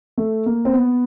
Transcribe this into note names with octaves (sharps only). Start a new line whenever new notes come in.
A3
A#3
C4
B3